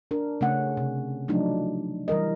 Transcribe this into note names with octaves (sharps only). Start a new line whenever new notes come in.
D4 A#4
C#3 A3 C#4 F#5
C3
F3 F#3 A3 D4 D#4
E3 G3 A#4 D#5